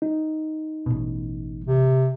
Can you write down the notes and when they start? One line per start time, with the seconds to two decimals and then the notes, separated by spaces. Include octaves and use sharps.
0.02 D#4
0.86 A1 B2
1.67 C3